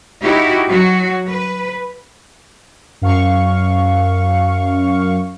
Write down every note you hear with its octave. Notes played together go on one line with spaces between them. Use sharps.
D#4 E4 F#4 G4
F#3 F#4
B4
F#2 F5 C#6